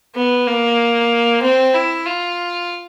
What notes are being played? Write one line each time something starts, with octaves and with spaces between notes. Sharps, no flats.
B3
A#3
C4
E4
F4